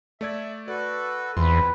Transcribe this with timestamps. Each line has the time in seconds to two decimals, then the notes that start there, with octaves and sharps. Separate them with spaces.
0.21 A3 D5 E5 G#6
0.68 F#4 A4 B4 D5
1.37 E2 C4 F4 B4 C6